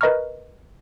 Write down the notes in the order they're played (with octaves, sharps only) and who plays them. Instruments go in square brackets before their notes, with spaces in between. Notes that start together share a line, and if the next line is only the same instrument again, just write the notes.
[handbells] A#4 B4 D#5 A#5 C#6 F6